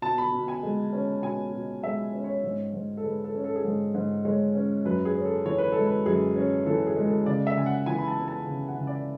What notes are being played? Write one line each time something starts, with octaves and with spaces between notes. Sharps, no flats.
B2 A5
B5
B2
G#5
G#3
C#4
B2 G#5
B2
G#3 E5
C#4
C#5
G#2
G#2
A4
G#3 B4
A4
C#4
A4
G#4
G#2 A4
G#2
G#3 C#5
C#4
F#2 B4
G#4
C#4
A4
E3 C#5
B4
G#3 A4
B4
F#2 G#4
C#4
E3 A4
G#4
G#3
A4
C#3 D5
E5
C#3 G#5
F#5
E3 G#5
B5
A5
B3
A5
C#3
F#5
C#3
D5